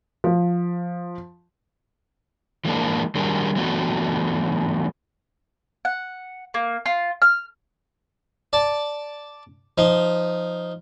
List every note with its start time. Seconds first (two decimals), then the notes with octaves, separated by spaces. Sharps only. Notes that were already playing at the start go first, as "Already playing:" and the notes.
0.24 F3
2.65 E3 G#3 A#3 D4
3.15 D#3 F#3 G3 D4 G#4 A#4
3.56 E3 F#3 A3 B3 D4 F#4
5.85 F#5
6.54 A#3
6.86 F4
7.22 F6
8.53 D5 A5
9.78 F3 D#4